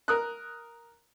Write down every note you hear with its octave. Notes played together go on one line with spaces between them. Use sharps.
A#4 D#6 F#6